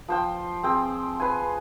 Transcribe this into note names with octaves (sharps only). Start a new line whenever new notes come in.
F3 C5 G5
C4 G#4 G5
B4 C5 G#5